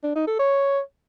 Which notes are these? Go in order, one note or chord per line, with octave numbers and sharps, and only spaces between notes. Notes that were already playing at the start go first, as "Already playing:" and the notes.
D4
D#4
A4
C#5